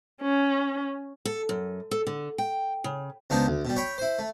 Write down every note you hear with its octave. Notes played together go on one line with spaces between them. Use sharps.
C#4
A4
F#2
A4
D3
G5
C#3
C#2 B3 D4 D#4 C5
D2
B2 G3
C#5 G5 B5
E4 C5
A3